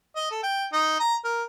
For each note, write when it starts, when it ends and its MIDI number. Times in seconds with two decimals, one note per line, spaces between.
0.16 0.27 75
0.31 0.39 69
0.43 0.65 79
0.73 0.97 63
1.00 1.16 82
1.25 1.43 70